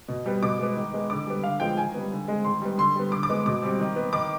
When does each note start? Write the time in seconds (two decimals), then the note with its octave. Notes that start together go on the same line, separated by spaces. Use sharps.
0.08 B2
0.26 G3 B3
0.42 B2 D6
0.59 G#3 B3
0.76 D#3
0.94 G#3 B3
1.10 D3 D6
1.27 G3 B3
1.44 D3 F5
1.60 F3 G#3 B3 G5
1.78 D#3 G#5
1.94 G3 B3
2.12 D3
2.28 G#3 C4
2.44 D#3 C6
2.62 G3 B3
2.78 D3 C6
2.95 G3 B3
3.12 D3 D6
3.23 D6
3.29 G#3 B3
3.46 B2 D6
3.62 G3 C4
3.80 D#3
3.96 B3
4.13 D#3 D6